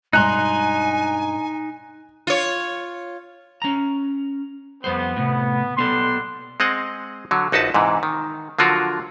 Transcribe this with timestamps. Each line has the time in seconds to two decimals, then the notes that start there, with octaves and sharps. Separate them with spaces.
0.13 G2 B2 G#3 D#4 G#5 A#5 C6 F#6
2.27 F4 C#5
3.62 C#4 A#5
4.84 F2 G3 B3 C5
5.16 A2 C3
5.77 B1 G3 B3 A4 F#5 C6
6.60 G#3 C4 D#5 F#5
7.31 D3 F#3
7.52 A#1 D#4 F#4 B4 A5
7.74 G#2 C3 E3
8.03 D#3
8.59 D3 F3 F#3 F4 F#4 A#4